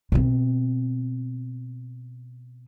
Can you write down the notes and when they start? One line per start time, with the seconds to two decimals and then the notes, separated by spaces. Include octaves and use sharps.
0.12 B2 C4